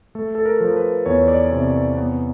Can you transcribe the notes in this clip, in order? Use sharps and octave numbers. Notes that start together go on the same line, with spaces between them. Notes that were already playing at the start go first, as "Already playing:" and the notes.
A3 A4
A4
A#4
F3 A#4
B4
E2 C#5
D5
C3
B3